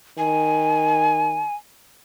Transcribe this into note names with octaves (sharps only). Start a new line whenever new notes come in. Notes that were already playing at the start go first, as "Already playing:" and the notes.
D#3 G#5